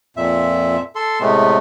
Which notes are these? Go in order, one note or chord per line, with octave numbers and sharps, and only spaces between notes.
F2 A#2 E5
A4 C6
A2 C3 G#3 A3 B3